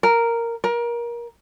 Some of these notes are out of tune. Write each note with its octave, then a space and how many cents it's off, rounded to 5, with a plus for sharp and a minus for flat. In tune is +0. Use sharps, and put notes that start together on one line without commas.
A#4 -5
A#4 +25